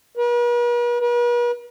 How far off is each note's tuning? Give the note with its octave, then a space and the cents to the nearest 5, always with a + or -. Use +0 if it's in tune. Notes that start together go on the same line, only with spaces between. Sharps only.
B4 -45
B4 -45